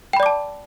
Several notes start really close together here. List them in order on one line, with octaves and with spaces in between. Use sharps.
G5 B5 D5 D6 A5